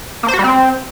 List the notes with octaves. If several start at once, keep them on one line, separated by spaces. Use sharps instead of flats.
A#3
C5
F#4
G3
C4